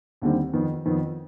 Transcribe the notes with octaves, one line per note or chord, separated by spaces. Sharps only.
D#2 D3 G3 C4 D#4
F2 D#3 B3
F2 D#3 B3